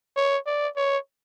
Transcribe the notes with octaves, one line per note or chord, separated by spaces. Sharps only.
C#5
D5
C#5